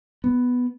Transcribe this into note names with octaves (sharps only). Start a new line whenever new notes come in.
B3